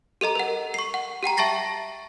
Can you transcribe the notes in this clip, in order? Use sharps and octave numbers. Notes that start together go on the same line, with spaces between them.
G4 A4 D#5 A#5
A#4 F#5
C#6 C7
F#5
G4 F#5 G5 A#5
E5 A5 C#6 A6 A#6 C7